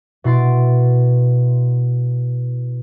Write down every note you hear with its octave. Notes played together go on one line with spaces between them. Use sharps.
B2 E4 C6 A6 D7